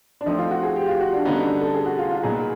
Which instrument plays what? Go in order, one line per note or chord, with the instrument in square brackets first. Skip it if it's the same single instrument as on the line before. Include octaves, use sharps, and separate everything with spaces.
[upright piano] D4
[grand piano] F3 A3 C4 [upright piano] D#4
[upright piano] F4
F#4
G#4
G4
F4
F#4
D4
[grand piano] D3 G3 B3 D#4 [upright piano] C#4
[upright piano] D4
A4
G#4
F#4
F4
F4
[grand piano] A#2 F#3 B3 D#4 [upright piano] G#4